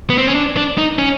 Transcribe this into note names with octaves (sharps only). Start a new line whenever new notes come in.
B3
C4
C#4
D4
D4
D#4
C#4